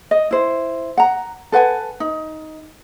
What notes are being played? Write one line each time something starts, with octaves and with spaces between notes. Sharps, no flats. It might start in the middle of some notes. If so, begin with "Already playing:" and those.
D#5
E4 C5
F#5 A#5
A4 B4 F#5 G#5
D#4